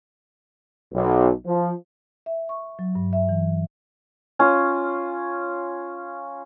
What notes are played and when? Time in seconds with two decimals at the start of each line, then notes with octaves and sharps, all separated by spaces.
0.94 B1
1.47 F3
2.26 E5
2.49 C#6
2.79 F#3
2.95 G2
3.13 E5
3.29 E3
4.39 C#4 F4